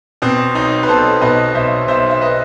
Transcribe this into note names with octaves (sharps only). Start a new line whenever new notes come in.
B2 C4
B1 D#4
B4
B1 A4 C5
B2 B4 D#5
B1 C5 E5
B1 C5 E5
E5
B4 D#5